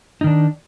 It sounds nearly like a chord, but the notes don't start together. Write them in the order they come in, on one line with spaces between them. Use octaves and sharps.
D#4 D#3 D4